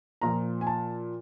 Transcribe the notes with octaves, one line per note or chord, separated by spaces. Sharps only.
A#2 F3 A#5
G#5
A5